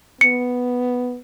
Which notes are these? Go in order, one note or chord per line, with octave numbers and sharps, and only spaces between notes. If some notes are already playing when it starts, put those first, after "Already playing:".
B3 C#7